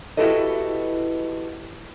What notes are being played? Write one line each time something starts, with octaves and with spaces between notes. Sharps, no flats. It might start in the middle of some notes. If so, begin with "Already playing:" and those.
E4 F#4 G4 A4 B4 D#5